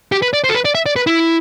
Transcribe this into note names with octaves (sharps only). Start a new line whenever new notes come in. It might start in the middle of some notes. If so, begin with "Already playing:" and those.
G4
B4
D5
C5
A4
B4
D5
E5
D5
B4
E4